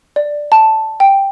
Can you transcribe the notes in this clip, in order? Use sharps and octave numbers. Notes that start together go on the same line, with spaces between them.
D5
A5
G5